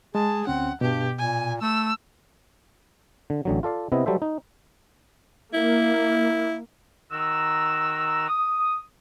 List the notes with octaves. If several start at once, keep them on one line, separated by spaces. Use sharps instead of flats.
G#3 G#4 A5
D2 C4 C#4 F#5
G2 B2 G4
A#2 G#5
A3 E6
D3
A1 D3 F#3
F4 A4 D5 F5
C3 B3 E4 D#5
F#3 G3 A4 C5 E5
D#4
A#3 E4
D#3 F#4 A#5 E6
D#6